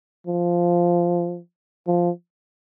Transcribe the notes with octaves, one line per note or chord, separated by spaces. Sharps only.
F3
F3